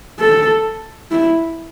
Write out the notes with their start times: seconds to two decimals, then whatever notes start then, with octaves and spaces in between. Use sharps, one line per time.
0.20 A4
1.11 E4